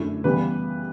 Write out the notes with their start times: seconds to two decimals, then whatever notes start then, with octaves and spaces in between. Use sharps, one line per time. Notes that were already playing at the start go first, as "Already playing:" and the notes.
Already playing: F#2 D3 A3 E4
0.24 C#3 E3 G3 B3 B4